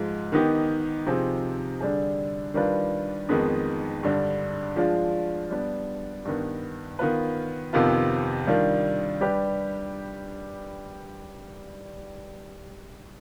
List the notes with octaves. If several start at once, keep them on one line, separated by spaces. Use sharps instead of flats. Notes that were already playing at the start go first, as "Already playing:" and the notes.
Already playing: G#2 F3 G#3
D#3 B3 D#4 G4
C3 F3 C4 D#4 G#4
D3 G3 D4 G#4
D#3 G3 D4 F4 B4
F2 D#3 G#3 B3 D#4
G2 D3 G3 D4
F3 G#3 D4 F4
G3 B3 D4
G2 D#3 B3
D#3 B3 F4 B4
F2 C3 D#3 B3 F4
D#3 G3 D4 F4
G3 D4 G4 B4